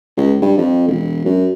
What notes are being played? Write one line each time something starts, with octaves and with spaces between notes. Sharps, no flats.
C#2
G2
F2
E1
F#2